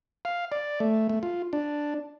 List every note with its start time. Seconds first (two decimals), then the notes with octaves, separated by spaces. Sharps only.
0.25 F5
0.52 D5
0.80 A3
1.09 A3
1.23 F4
1.53 D4